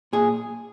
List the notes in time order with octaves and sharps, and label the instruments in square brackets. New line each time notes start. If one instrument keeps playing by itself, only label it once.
[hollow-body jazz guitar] A#2 G#4